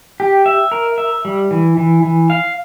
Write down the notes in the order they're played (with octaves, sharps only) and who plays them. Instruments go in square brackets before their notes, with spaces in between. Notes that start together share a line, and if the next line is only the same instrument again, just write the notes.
[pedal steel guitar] G4
E5
A#4
E5
G3
E3
E3
E3
F5